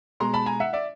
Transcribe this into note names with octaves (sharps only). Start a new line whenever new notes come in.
B2 G#3 A#5 C6
A5 B5
G#5 A#5
E5 F#5
D5 E5